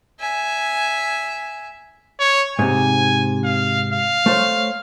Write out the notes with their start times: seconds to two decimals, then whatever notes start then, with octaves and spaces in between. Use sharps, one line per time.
0.20 E5 G#5
2.20 C#5
2.59 G#2 C3 G#5
3.44 F5
3.93 F5
4.26 A3 C5 C#5